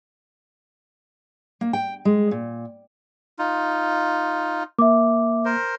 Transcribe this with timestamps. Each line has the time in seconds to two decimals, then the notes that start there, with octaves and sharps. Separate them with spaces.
1.61 A#3
1.73 G5
2.05 G#3
2.31 A#2
3.39 D#4 F4
4.79 A#3 E5 D6
5.45 A#4 C5